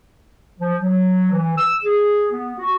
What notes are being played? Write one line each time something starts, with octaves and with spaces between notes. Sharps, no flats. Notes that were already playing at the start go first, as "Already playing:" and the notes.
F3
F#3
E3
E6
G#4
B3
F#4